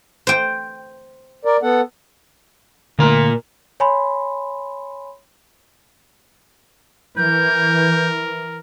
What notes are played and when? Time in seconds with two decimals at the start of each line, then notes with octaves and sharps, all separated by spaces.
0.27 C5 G5
1.45 A#4 D5
1.63 B3 A4 F#5
2.99 A#2 D3 A3 A#4
3.80 C#5 G#5 B5 C6
7.17 E3 A#4 G6